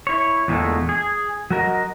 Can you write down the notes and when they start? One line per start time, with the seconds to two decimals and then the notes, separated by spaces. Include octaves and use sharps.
0.07 E4 C#5
0.48 E2 A#2 D3 G#3 A3
0.89 G#4
1.51 F#3 F#4 A#4 D#5